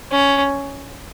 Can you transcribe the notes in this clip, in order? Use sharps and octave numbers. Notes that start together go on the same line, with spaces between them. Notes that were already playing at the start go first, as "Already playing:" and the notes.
C#4